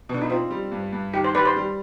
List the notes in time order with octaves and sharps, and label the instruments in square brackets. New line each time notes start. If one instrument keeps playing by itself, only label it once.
[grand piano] B2
[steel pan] D4
D#4
[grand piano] C4 [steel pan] F4
[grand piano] G3
G2
G2
[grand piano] D#3 [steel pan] G4
[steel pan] C5
[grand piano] G3 [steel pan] B4 D5
[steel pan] C5
[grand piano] G3